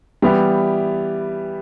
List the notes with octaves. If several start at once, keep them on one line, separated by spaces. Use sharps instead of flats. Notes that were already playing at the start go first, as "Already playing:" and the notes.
E3 G3 B3 E4 G4